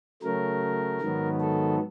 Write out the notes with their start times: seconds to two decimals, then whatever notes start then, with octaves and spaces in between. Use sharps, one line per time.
0.22 C#3 F#3 A3 A#4
1.01 G#2 D#3 F#3 B3
1.40 A4